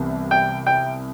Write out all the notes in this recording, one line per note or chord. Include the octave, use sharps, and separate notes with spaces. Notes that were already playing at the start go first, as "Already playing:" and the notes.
Already playing: C2 C3 E3 B3
G5
G5